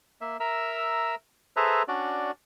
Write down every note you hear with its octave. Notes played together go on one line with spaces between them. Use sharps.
A#3 E5
A#4 E5 A#5 E6
G#4 A4 B4 C5 E5 A#5
C#4 D4 F#4 D5